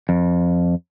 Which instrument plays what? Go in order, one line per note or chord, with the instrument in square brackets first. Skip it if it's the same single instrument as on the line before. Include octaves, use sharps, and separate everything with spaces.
[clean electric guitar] F2